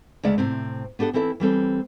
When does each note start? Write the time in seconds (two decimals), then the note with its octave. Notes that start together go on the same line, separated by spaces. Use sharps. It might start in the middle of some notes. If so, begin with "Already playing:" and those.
0.23 D2 C#3 G#3 D5 E5 F#5
0.38 A2 C3 C4
0.99 B3 D4 G4 A4 F#5
1.13 E3 C4 E4 A4 E5
1.40 E3 G3 C4 A4